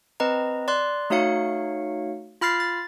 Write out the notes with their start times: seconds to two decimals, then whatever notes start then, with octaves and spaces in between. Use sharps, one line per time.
0.20 C4 B4 D#5 A#5
0.68 D5 C6 F#6
1.10 A3 D#4 F#4 C#5 F5 C#7
2.41 F4 B5 F6 A6 C7
2.60 A6